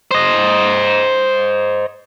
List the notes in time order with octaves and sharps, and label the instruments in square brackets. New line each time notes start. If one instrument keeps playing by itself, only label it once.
[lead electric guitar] C5 D#5